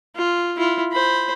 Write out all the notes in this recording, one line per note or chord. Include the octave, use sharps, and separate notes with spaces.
F4
E4 F4
C5 B5